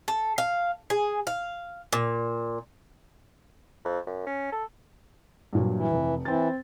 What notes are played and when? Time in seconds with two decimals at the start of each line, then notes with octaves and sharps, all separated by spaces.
0.08 A4
0.38 F5
0.90 G#4
1.27 F5
1.93 A#2
3.85 F2
4.07 F#2
4.26 C#4
4.52 A4
5.53 G2 A#2 F#3
5.74 E3
5.92 F1
6.25 E3 C4 A6